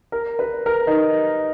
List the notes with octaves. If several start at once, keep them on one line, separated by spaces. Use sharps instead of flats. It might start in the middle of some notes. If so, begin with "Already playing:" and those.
A#4
B4
A#4
D#4